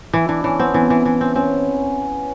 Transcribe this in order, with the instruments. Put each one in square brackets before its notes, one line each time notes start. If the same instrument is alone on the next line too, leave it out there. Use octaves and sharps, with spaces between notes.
[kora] E3 [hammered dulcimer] E4
[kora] E3 [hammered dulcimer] D4
[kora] E3 [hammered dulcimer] C#4
[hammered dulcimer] B3 [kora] C4
[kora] E3 [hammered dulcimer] C#4
[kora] E3
E3
C4
[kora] C4 [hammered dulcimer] C#4